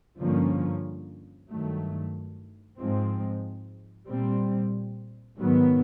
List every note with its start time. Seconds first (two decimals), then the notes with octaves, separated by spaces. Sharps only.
0.19 G2 D3 F3 A#3 C#4
1.49 G2 D#3 F#3 A3
2.78 G#2 F3 G#3 C4
4.07 A#2 G3 C4
5.37 G#2 D#3 F#3 B3